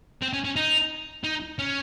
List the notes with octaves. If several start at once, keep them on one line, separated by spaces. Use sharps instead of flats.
C4
C#4
C#4
D#4
D#4
C#4